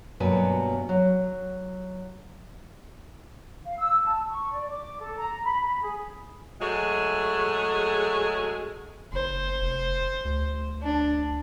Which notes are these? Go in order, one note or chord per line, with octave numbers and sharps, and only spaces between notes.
G2 B2 F#3 A#3 B4 G#5
F#3
F5
E6
A5
C#6
D5
D6
A4
A#5
B5
G#4
F#3 G#3 A3 G#4
F#1 C5
F1
D2
D4